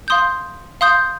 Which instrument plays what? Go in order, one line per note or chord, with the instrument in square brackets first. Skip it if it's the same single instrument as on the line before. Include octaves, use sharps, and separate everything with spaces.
[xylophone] F5 C6 D#6 G6
F5 C6 D#6 G6